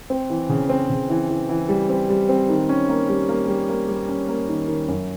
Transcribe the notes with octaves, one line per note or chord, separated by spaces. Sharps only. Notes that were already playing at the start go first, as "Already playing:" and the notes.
C4
E3
C#3
C4
C#3
E3
E3
E3
G3
C4
G3
C4
D#3
C#4
A#3
G3
A#3
G3
A#3
G3
C#4
A#3
D#3
D#3
F#2